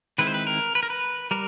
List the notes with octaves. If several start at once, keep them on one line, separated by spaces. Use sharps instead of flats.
D#3 G#3 C4 E4 B4
C5
B4
A#4
B4
A#4
B4
G3 A#4